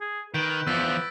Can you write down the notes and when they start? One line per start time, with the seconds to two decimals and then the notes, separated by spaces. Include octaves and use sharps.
0.01 G#4
0.34 D#3 B4 G6 D7
0.67 E2 F3 E6 A6 B6